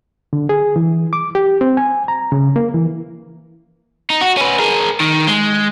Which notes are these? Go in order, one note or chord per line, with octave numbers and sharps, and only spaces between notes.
D3
G#4
E3
D6
G4
C4
G#5
A#5
C#3
A#3
E3
D#4
F#4
C#4 B4
G#4 A#4
D#3
G#3